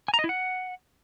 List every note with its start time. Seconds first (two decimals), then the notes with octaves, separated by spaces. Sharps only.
0.08 G#5
0.14 A#5
0.19 D#5
0.24 E4
0.29 F#5